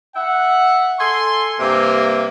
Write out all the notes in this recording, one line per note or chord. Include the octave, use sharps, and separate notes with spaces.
E5 F#5
A4 G#5 C6
G2 C3 A#3